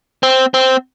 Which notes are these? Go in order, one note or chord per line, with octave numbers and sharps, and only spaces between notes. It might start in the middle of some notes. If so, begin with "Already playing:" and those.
C4
C4